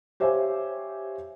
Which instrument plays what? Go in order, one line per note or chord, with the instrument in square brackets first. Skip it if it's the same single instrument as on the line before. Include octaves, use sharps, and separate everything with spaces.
[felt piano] G4 C5 C#5 E5 F5 G#5